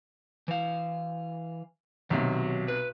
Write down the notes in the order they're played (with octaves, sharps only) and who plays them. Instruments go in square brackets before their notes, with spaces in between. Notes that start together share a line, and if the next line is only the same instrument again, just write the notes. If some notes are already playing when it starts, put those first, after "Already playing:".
[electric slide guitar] E3 F5
[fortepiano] B1 C3 [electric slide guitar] D#3 F#3
[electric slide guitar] B4